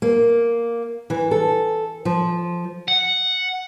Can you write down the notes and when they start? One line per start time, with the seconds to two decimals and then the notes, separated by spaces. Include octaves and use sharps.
0.02 A#3
1.10 E3
1.31 A4
2.05 F3
2.88 F#5